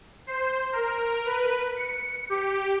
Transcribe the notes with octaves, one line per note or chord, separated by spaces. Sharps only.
C5
A#4
B4
C#7
G4